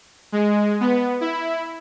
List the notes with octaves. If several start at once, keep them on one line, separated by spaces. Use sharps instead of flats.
G#3
B3
E4